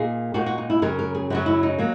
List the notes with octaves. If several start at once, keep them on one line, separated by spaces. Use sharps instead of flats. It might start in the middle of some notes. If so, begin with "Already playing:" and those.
Already playing: A#2 A#3 D#4 G#4
A#2 A#3 D#4 F#4
F#4
D#4
E4
F#2 C#3 F#3 A#4
A#4
G#4
F#2 C#3 F#3 F#4
E4
D#4
F#3 A#3